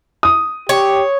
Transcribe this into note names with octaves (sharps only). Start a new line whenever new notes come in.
D#6
G4 C#5